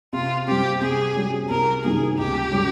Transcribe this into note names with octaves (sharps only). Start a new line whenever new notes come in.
C3 F4
G3 C4 G4
C3 G#4
G3 C#4
C2 A#4
C3 D#3 G3 A#3 G#4
C#2 G4
C#3 G3 C#4